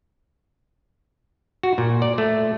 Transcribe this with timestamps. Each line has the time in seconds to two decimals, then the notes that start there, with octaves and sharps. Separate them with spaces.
1.63 F#4
1.78 A#2
2.02 D5
2.18 A3